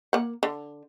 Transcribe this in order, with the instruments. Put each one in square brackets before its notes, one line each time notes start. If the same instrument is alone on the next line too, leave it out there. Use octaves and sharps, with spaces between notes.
[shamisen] A#3 F#5
D3